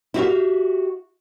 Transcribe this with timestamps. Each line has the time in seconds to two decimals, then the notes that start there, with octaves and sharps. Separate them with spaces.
0.14 E4 F#4 G4 E5 F5